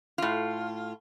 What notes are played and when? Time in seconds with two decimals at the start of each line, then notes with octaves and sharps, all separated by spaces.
0.18 A2 F4